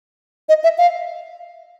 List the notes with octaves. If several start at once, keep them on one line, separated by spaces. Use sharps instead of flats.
D#5
E5
F5